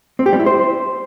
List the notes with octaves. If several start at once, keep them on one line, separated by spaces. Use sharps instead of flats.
C4
G4
G3
E4
C5